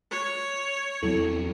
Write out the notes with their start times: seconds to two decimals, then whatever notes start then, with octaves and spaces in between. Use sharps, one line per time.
0.11 C#5
1.03 E2 F#3 C4 E4 A4